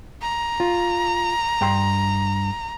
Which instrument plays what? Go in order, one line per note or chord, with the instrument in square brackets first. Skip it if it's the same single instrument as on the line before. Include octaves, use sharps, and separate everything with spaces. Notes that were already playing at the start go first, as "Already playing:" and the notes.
[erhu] A#5
[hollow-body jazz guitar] F4
G2 G5 C6